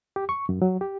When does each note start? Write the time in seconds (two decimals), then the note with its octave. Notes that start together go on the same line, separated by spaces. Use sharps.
0.16 G4
0.29 C#6
0.49 F#2
0.62 F#3
0.81 G4